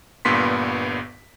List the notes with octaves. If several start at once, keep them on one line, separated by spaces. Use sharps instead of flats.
G1 G2 A#2 B3 C6 B6